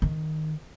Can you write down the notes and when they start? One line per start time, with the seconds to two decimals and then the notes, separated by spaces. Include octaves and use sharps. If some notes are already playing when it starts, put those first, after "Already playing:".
0.02 D#3